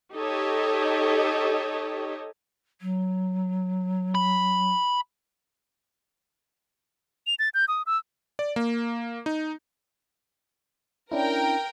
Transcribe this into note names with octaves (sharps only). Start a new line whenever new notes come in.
D#4 G4 A4 C#5 D#5
F#3
B5
F7
A6
G6
D#6
E6
D5
A#3
D#4
C#4 D4 E4 A#4 G5